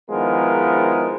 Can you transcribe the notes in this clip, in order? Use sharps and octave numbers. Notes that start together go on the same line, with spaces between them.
D#3 F3 G#3 B3 E4 A#4